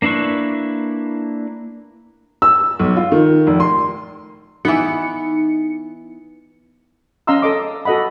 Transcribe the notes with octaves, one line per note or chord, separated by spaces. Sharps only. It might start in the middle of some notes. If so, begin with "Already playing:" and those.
A#3 D4 E4 B4 C#6
E6
B1
F4
D#3
F1
C6
E3 B3 D#4 C#7
C#4 D#5 F5 A#5 C6 E6
A4 D#5 D6
F#4 A4 D#5 F#5 B5